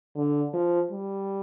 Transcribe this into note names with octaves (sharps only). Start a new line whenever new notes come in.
D3
F3
G3